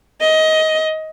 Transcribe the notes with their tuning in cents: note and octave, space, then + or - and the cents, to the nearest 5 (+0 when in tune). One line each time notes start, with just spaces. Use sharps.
D#5 +20